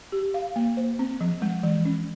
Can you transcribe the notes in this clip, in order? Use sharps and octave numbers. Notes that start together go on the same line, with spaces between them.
G4
F5
A#3
C5
C4
F3
G#3
E3
C#4